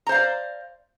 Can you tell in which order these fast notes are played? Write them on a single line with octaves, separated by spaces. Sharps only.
A#5 C5 F5 D5